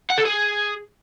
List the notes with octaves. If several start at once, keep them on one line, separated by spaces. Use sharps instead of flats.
F#5
A4
G#4